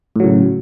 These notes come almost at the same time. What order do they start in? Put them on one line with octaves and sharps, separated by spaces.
A2 F#3 C#3